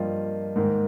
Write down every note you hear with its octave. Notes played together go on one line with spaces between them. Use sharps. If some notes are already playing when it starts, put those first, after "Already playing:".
Already playing: G2 F3 A#3 F4 D#5 G5
G#2 D#3 A#3 D#4